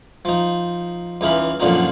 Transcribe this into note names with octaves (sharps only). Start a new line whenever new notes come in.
F3 D#4
C#2 E3 D#4 F5 B5
F#2 A#2 D3 F3 D#4